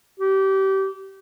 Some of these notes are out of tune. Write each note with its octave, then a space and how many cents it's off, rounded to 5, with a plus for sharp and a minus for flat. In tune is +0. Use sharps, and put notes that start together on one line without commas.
G4 -25